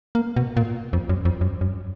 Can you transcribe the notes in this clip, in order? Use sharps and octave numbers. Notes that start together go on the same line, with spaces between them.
A#3
B2
A#2
F2
F#2
F2
F#2
F#2